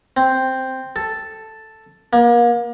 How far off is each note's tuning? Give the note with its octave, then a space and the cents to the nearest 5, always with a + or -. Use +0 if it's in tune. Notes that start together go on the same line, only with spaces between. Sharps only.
C4 +0
A4 +0
A#3 +35